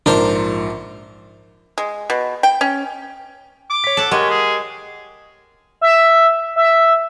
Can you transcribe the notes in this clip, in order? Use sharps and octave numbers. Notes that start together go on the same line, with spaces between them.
A#1 G#2 F3 D4 A#4 C5
G#3
B2
G5
C#4
D6
C#5 B6
A4 F#5
G#3 G4 A#4 C#5 F#5
G#4
E5
E5